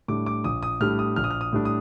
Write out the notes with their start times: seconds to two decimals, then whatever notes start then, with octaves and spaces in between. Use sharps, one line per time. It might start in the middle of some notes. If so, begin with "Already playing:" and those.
0.08 A2 G3 D4 D6
0.26 D6
0.44 A#1 D#6
0.63 D#6
0.81 A2 G3 D4 F6
0.99 D#6
1.16 A#1 F6
1.24 D#6
1.30 F6
1.41 D#6
1.53 A2 G3 D4
1.65 D#6